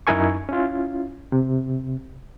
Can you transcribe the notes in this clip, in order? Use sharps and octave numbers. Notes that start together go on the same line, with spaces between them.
F#2 D#4 E4 A#4 G#5 C#6
C#4 E4 F4
C3